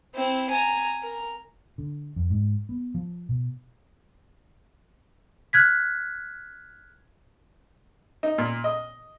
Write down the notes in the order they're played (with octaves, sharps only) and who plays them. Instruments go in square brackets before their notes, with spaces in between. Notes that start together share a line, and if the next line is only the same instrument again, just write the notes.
[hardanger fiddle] C4 E4
G#5 A#5
A#4
[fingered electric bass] D3
F2
G#2
B3
F3
B2
[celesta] F6 F#6 G#6 B6
[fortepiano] D#4
A#2
D#5